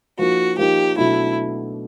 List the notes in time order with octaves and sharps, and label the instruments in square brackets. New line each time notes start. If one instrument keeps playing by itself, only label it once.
[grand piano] F3 A#3 D#4 [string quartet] F#4
[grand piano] F3 A#3 D#4 [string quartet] G4
[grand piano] B2 F#3 A3 D4 F#4 [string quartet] E4